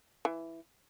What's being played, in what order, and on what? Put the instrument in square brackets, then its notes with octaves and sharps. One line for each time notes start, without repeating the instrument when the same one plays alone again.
[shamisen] E3